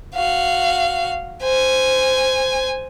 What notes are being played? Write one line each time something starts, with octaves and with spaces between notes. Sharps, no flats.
F#4 F5
C5 G#5